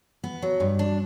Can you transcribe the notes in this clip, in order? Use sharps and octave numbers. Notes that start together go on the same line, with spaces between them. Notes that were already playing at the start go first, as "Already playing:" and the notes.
B3
F#3
G2
D4